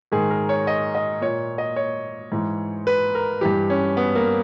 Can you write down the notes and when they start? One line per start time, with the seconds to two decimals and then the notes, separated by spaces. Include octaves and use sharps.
0.12 G#2 D#3 G#4
0.30 A#4
0.49 C#5
0.67 D#5
0.95 D#5
1.21 A#2 C#5
1.58 D#5
1.76 C#5
2.32 G#2 E3
2.87 B4
3.15 A#4
3.41 G2 E3 G4
3.70 C#4
3.97 B3
4.15 A#3